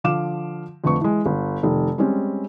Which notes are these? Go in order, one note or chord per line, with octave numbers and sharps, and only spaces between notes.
D3 F3 F5 D6 E7
F2 D3 A3 B4 C#6
E3 G#3
G1
F1 D#3
G3 G#3 C4 C#4